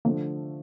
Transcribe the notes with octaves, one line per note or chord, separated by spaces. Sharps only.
D3 F3 A3 A#3